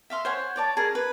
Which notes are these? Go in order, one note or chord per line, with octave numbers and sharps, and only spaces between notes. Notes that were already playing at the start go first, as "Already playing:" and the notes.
E5 F5 C6
C5 C#5 F#5 G#5
C#5 D5 A5
G#4 A#4
B4